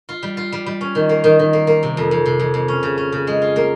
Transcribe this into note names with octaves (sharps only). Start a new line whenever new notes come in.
F4
G3
F4
G3
G3
C#4
D#3
A#3
D#3
D#3
A#3
A#3
C3
F2
F2
C3
F2
F2
C#4
C#3
C#4
C#3
G#3
F4
A#3